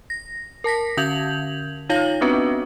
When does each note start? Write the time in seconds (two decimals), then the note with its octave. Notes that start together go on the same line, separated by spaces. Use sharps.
0.10 A#6
0.64 A#4 A5 A#6 B6
0.97 D3 C#4 G6 G#6 F7 F#7
1.89 D#4 F4 C#5 F5 A#6 F#7
2.21 B3 C4 D4 F#4 B4